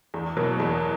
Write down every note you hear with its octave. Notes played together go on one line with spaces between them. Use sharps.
E2
B2 F#3 A#3
E2